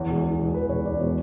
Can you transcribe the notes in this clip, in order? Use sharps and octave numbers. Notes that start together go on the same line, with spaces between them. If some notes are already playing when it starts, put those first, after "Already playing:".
Already playing: E2 C#5
B2 G#3
E2
B2 G#3
E2 B4
B2 G#3 C#5
E2 D5
B2 G#3 C#5